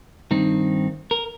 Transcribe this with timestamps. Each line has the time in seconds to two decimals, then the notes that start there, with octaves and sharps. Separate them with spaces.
0.31 G2 D#3 C4 D#4
1.11 A#4